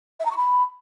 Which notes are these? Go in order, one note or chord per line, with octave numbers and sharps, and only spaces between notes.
E5
A#5
C#6
B5